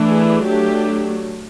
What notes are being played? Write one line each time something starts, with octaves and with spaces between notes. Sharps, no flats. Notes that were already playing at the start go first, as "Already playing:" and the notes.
Already playing: E3 A3 D4
G#4
F#3 A3 D4 G4